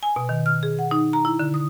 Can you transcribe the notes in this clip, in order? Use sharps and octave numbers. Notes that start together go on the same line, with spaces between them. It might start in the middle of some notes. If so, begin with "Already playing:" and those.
G#5
B2
D#3
F6
G#4
F#5
D#4
A#5
E4
D3
D#6